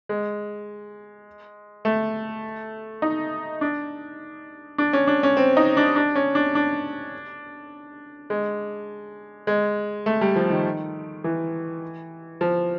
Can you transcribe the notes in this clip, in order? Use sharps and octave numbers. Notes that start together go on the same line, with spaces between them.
G#3
A3
D#4
D4
D4
C#4
D4
C#4
C4
D#4
D4
D4
C#4
D4
D4
G#3
G#3
A3
G3
F3
D#3
E3
F3